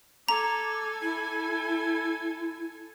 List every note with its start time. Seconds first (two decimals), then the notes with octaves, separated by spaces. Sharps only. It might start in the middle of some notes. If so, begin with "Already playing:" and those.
0.28 A4 G#5 A#5 D6
1.02 E4